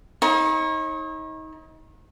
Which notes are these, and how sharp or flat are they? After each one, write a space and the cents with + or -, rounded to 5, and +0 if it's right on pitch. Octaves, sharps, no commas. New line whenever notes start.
D#4 +30 C#5 -35